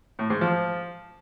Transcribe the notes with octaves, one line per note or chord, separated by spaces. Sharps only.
A2
G#2
F3